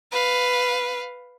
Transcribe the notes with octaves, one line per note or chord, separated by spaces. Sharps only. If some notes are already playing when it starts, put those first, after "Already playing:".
B4 F5